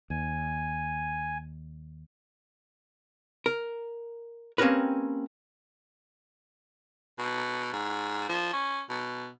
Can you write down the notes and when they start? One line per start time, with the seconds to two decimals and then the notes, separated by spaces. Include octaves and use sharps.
0.10 D#2 G#5
3.46 A#4
4.58 A#3 C4 C#4 G4 A#4 B4
7.19 B2
7.73 G#2
8.29 F3
8.53 C#4
8.89 B2